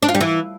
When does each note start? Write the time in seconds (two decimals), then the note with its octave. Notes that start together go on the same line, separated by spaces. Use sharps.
0.03 D4
0.09 F4
0.15 G3
0.21 E3